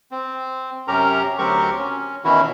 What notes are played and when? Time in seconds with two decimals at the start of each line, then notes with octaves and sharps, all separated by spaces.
0.11 C4
0.88 F#2 C3 C#4 G4 A#4 A#5
1.38 D2 F#3 C4 G4 A#4 C#6
1.79 C#4
2.24 B2 D#3 E3 C#4 E4 F#4